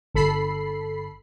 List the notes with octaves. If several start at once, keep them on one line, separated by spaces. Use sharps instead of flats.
G1 A4 B5 C7